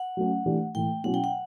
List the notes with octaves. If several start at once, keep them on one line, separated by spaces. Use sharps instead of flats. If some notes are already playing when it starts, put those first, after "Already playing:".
Already playing: F#5
F#3 A3 C#4
E3 A3 D4 G4
A2 E3 A3 G5
B2 F#3 C#4 E4 F#5
G5
F#5